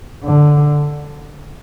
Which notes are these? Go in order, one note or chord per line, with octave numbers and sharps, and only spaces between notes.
D3